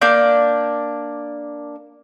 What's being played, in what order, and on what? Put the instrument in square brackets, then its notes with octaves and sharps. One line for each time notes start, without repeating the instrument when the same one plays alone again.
[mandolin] A#3 D4 D5 G6